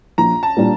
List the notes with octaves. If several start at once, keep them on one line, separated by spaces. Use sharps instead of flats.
A#1 A#5
A5
A#2 G3 D4 F4